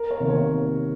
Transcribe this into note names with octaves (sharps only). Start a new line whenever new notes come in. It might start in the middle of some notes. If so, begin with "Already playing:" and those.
Already playing: A#4
C#5
C3 D#3 A#3
C#5